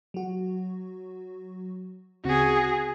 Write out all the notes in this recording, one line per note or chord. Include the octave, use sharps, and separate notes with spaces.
F#3 F#4
D2 C#3 C4 F#4 G#4